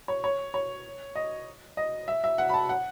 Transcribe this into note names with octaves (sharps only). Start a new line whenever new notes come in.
C#5
C#5
C#5
D#5
D#5
E5
E5
F#5
B5
A5
F#5